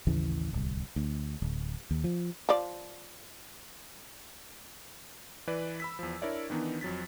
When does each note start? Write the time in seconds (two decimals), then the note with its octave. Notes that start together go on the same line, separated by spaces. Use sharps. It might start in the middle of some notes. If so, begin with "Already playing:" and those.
0.07 A1 D#2 C#3 E3
0.53 D1 C2
0.96 D2
1.42 D1
1.91 D#2
2.04 F3
2.49 F3 D5
5.47 E3 B4 D5
5.80 B5 E6 B6
5.99 E2 F3
6.22 D4 E4 A#4 C#5 D5 E5
6.50 D#3 E3 B3 D4 D#4
6.81 F2 F#3 A6 B6